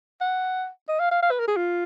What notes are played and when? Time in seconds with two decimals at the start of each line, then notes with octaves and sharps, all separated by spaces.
0.21 F#5
0.89 D#5
1.00 F5
1.11 F5
1.22 F5
1.31 B4
1.40 A#4
1.48 G#4
1.57 F4